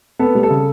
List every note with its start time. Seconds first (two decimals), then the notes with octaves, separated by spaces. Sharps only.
0.19 B3 A4
0.35 G3
0.43 A4
0.50 C#3